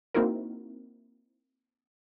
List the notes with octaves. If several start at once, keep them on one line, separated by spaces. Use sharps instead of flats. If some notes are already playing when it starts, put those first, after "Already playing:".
A#3 C4 D#4 E4 F#4 A#4